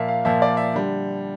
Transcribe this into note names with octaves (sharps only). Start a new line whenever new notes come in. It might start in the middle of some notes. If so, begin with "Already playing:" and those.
Already playing: A#2 F3 A#3 E5
F5
A#2 F3 A#3 E5
D5
E5
D3 G3